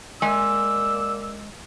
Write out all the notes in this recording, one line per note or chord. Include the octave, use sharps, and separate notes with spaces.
G#3 A#3 D5 G#5 E6